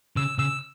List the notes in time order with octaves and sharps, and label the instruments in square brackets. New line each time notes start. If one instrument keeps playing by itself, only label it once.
[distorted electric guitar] C#3 [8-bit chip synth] E6
[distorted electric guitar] C#3 [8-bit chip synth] E6